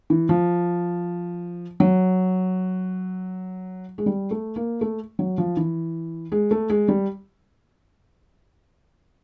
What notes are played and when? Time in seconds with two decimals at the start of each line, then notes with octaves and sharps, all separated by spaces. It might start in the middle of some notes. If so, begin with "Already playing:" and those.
0.10 E3
0.29 F3
1.80 F#3
3.98 G#3
4.06 G3
4.31 A3
4.56 A#3
4.81 A3
5.19 F#3
5.38 F3
5.57 E3
6.32 G#3
6.51 A3
6.70 G#3
6.88 G3